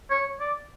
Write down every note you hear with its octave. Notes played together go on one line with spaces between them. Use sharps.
C#5
D5